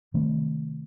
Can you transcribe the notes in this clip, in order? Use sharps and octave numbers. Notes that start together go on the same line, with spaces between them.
C3 D#3 A3 C4